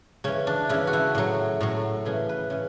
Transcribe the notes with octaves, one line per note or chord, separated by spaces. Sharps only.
C#3 E3 C#4
D4
C#3 E3 E4
F#4
E4
A2 F#3
A2 F#3
C#3 E3 G#4
B4
C#3 E3